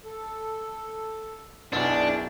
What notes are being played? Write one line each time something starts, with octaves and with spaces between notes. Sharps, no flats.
A4
B1 F#2 B2 D4 E4 G#4 D5